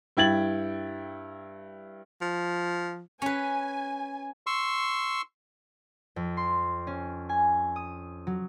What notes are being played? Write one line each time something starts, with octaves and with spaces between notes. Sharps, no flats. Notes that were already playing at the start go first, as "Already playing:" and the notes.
G2 E4 G5 G#6 A6 F#7
F3
C#4 B4 G#5
C6 C#6 E6
F2
C6
C#4
G#5
D#6
F#3